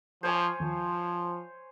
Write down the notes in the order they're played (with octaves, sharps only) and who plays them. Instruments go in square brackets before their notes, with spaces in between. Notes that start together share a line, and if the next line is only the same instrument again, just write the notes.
[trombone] F3 [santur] C5 C#5 G#5
[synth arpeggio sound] D#2 [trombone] F3